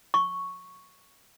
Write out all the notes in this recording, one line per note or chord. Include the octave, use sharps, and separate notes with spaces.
C#6